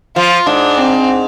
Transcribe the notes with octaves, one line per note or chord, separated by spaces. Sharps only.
F3 F4
G#2 D4
C4